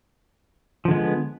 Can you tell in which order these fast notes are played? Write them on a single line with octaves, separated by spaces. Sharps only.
F3 D3 G#3 B3